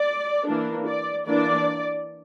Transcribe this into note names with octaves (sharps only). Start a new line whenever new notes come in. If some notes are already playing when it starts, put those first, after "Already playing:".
Already playing: D5
E3 A#3 D4
D5
E3 A#3 D4 D5